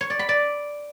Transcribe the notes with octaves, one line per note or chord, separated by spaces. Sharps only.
C#5
D5
B5
D5